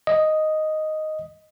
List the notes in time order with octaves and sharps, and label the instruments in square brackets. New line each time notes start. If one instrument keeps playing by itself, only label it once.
[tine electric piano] D#5